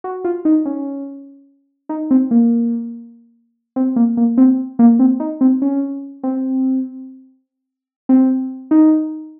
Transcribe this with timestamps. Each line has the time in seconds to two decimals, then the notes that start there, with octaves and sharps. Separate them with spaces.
0.04 F#4
0.24 F4
0.45 D#4
0.65 C#4
1.89 D#4
2.11 C4
2.31 A#3
3.76 C4
3.96 A#3
4.17 A#3
4.38 C4
4.79 A#3
4.99 C4
5.20 D#4
5.41 C4
5.62 C#4
6.23 C4
8.09 C4
8.71 D#4